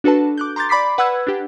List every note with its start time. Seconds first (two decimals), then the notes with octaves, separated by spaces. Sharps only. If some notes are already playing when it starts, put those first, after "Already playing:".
0.04 D4 F#4 A4 B4 A5
0.38 D6 F#6 G6
0.56 A#5 C6 D6 G6 A6
0.69 D5 B5 D6 B6 C7
0.98 B4 F#5 B5 E6 F#6 G#6
1.27 D4 G4